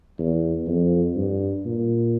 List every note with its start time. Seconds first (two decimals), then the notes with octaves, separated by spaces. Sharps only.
0.19 E2
0.67 F2
1.17 G2
1.66 A#2